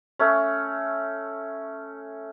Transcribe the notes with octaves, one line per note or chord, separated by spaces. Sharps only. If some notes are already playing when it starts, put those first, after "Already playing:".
A3 C#4